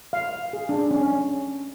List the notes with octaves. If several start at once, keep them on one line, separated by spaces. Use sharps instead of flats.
F5
G#4
D4
C#4